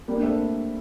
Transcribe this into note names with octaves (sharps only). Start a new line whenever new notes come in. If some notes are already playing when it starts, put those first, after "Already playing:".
G3 A#3
D4
A3 C4